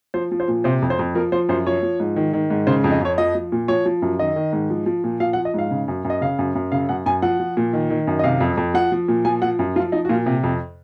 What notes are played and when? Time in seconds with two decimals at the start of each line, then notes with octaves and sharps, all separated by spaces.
0.14 F3 C5
0.31 F3
0.40 C5
0.48 A#2
0.64 C3 C5
0.82 F2
0.90 C5
0.99 F2
1.15 F3 A#4
1.32 F3 C5
1.49 F#2 C5
1.66 F3 C#5
1.83 F3
2.00 G#2
2.16 D#3
2.33 D#3
2.50 G#2
2.67 C#3 C5
2.84 F2
2.92 D#5
3.01 F2 C#5
3.18 F3 D#5
3.35 F3
3.52 A#2
3.68 F3 C#5
3.86 F3
4.02 F#2
4.19 D#3 D#5
4.36 D#3
4.53 G#2
4.70 F3
4.86 F3
5.04 A#2
5.20 F3 F5
5.33 F#5
5.37 F3
5.45 D#5
5.54 G#2 F5
5.71 C#3
5.88 F#2
6.05 F#2
6.10 D#5
6.21 C#3 F5
6.39 F#2
6.55 F#2
6.72 C#3 F5
6.89 F#2 F#5
7.06 F#2 G#5
7.22 F3 F#5
7.40 F3
7.57 A#2
7.73 D#3
7.90 D#3
8.07 F#2
8.19 D#5
8.24 C3 F5
8.41 F2
8.57 F2
8.74 F3 F#5
8.92 F3
9.08 A#2
9.25 F3 G#5
9.42 F3 F#5
9.59 F#2
9.76 F3 F4
9.92 F3 D#4
10.05 F#4
10.09 A#2 F4
10.26 C3
10.44 F2